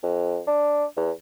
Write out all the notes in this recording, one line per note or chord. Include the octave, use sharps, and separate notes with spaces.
F2
D4
E2